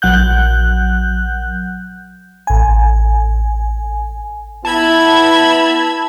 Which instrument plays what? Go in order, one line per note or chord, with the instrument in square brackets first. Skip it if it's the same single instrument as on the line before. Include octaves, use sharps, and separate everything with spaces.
[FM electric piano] A#1 F#3 F#5 F#6 G6
A1 G#5
[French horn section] B3 E4 [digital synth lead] A5 [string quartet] B5 E6 G#6